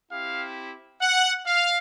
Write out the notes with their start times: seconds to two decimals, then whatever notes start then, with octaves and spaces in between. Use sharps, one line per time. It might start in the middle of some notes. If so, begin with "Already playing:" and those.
0.11 C4 E4 G4 F5
1.02 F#5
1.46 F5